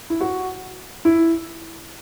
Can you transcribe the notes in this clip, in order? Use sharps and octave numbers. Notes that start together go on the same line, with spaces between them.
E4
F#4
E4